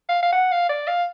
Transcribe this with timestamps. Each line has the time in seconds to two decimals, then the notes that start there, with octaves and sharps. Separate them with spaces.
0.09 F5
0.23 F5
0.32 F#5
0.51 F5
0.69 D5
0.87 F5